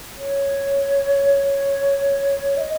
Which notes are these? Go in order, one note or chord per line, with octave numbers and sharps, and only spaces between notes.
C#5
E5
D#5